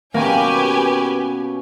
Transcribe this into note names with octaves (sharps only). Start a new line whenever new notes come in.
B2 A#3 C#4 G4 B4 C#5 G#5